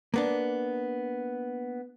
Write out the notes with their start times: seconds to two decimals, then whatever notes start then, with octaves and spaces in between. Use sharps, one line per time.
0.14 A#3 B3 D4